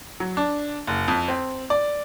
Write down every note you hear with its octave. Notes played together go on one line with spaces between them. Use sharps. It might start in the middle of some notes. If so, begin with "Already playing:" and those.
F#3
D4
F#1
F2
C4
D5